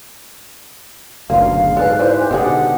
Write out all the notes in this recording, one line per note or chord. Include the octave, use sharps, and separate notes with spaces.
F#1 D2 B2 A#3 F4 F5
G#4
G#2 A4 B4 D5 G#5 F#6
E3 B4 C5 D5 F#6
G4 G#5
B2 D3 D#3 G#3 G#4 F#5